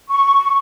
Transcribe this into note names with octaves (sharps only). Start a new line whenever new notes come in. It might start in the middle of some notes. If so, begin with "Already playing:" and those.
C#6